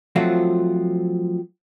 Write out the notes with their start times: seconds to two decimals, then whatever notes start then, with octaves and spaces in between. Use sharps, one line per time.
0.16 F3 F#3 A3 C4 F4 F#4